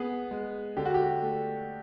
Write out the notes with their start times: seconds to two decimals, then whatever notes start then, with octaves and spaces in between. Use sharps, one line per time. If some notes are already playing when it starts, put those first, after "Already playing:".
Already playing: B3 G#4
0.31 G#3
0.77 D3 G4
0.85 F#4
0.94 G4
1.22 A3